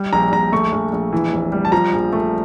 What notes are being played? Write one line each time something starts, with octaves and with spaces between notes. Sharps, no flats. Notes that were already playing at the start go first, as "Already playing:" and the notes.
Already playing: G3
A#1 A#5
A#1 A#5
A3 C#6
A#1
A#1
E3
F1
G3
A5
F3 A#5
A#1
A3